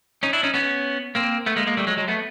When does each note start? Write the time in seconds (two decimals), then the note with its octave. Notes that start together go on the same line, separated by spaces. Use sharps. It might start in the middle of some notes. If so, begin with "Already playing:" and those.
0.23 C#4 D#4
0.33 D4 E4
0.43 C#4 D#4
0.54 B3 C#4
1.15 A#3 C4
1.46 A3 B3
1.56 G#3 A#3
1.67 G#3 A#3
1.77 G3 A3
1.87 F#3 G#3
1.97 F#3 G#3
2.08 A3 B3